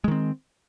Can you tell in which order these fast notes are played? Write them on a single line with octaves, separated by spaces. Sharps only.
G#3 D#3 C4